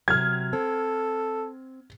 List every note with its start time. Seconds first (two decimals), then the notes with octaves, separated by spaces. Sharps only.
0.08 C3 F#3 F6 G#6
0.53 C4 A4